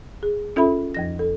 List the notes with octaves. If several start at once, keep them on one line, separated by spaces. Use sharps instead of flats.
G#4
C#4 F4 A4 E5 B5
F2 F3 A#6
A4